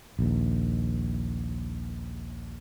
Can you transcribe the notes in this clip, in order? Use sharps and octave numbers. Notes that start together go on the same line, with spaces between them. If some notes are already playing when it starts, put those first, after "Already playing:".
A#1 D#2